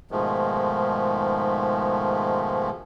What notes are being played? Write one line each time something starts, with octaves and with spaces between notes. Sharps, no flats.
G#2 B2 D#3 F3 G#3 A3